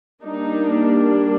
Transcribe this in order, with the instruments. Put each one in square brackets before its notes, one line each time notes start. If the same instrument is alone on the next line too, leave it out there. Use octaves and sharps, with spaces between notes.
[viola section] G3 A#3 D4 D#4